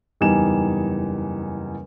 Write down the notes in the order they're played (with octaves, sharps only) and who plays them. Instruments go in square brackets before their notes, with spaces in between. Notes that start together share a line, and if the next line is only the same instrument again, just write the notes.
[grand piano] F#1 E2 G3 D#4 G#5 E7